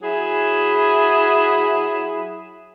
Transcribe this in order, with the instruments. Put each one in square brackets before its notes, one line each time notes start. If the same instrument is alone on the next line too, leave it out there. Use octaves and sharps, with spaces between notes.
[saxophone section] F#3 E4 G#4